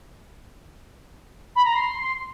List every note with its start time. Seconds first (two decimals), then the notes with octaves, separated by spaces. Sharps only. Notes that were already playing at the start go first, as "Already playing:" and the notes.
1.56 B5
1.65 A#5
1.74 C6